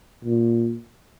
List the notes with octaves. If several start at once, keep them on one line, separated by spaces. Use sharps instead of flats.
A#2